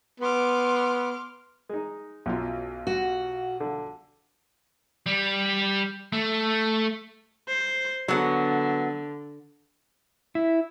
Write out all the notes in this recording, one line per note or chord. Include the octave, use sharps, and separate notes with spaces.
B3 C6 D6 F6
G#3 D#4
B1 F#2 F#3 F4
F#4
D3
G3
A3
C5
D3 F#3 B3
E4